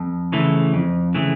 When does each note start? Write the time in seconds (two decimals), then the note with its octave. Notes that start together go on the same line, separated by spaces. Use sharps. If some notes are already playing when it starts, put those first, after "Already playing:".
Already playing: F2
0.32 C#3 E3 A3
0.74 F2
1.15 C#3 E3 A3